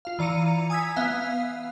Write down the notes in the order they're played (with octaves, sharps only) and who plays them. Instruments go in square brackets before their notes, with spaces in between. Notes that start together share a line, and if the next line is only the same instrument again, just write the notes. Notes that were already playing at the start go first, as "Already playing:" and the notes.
[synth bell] F4 F5
E3 D5 A#5 C#7 D#7
G#5 D#6 E6 G#6 B6
B3 E5 F5